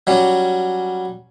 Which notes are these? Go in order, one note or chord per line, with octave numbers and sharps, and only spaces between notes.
F#3 G3 C#4